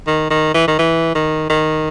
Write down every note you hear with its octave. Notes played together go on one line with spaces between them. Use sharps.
D#3
D#3
E3
D#3
E3
D#3
D#3